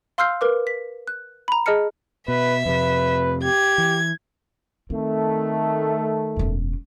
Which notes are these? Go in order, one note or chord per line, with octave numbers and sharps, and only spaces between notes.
F5 C6 E6 F6 G6 C7
A#4 B4 D6
B6
F#6
A#5 B5
G#4 D#5 A5 F6 C#7
B2 B4 E5
F2 C3 B4
G4 G#6
E3
D#3 A3 C4
E1 F#2